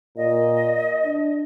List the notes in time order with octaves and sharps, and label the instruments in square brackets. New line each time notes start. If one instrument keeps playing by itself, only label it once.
[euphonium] A#2 [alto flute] D#5
[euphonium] D4